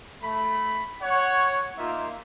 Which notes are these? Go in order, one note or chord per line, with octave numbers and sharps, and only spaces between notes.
A3 B5
C#5 F#5
A#3 D#4 F4 E5